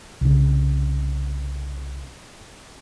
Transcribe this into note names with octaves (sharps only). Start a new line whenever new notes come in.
C2 C#3